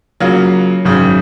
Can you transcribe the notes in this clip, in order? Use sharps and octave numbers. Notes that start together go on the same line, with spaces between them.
C#3 F#3 A#3 F4
G#1 F#2 C#3